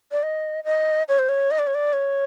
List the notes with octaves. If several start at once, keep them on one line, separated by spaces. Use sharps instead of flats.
D5
D#5
D#5
C#5
C5
C#5
D#5
D5
C#5
D5
C#5